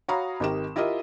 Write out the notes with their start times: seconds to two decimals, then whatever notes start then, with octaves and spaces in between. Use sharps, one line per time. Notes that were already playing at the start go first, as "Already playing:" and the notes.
0.08 F#4 C#5 F5 A#5 B5 D#6
0.40 G#1 D#3 G4 A#4 E7
0.76 E4 F4 G4 A#4 D#5 E5